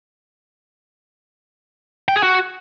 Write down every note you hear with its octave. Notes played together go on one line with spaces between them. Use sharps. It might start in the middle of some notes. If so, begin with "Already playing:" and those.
G5
G#4
F#4